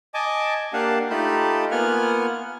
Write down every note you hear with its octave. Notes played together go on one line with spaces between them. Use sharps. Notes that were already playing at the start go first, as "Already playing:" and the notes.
D#5 G#5 A5 D6
A#3 D4 G4 F5 F#5 A5
A3 D#4 F4 G4 A5 B5
A#3 B3 F4 F#5 G#5 F6